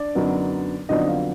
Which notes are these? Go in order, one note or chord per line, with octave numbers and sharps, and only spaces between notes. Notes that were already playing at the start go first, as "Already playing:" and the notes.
Already playing: D4 D5
F#2 D3 F#3 B3 D#4
F2 D3 F#3 B3 D4 D#4 D#5
F4 F5